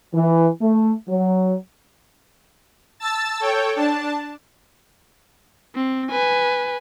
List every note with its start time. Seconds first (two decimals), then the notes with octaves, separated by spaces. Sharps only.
0.13 E3
0.60 A3
1.09 F#3
3.00 A5 E6 A6
3.40 A4 C#5 G5
3.76 D4 A5
5.75 C4
6.11 B4 G#5